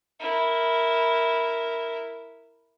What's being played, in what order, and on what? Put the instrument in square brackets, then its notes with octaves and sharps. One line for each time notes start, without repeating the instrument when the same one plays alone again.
[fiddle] E4 A#4